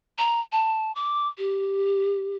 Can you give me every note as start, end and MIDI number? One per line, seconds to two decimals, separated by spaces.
0.18 0.40 82
0.52 0.94 81
0.95 1.28 86
1.38 2.36 67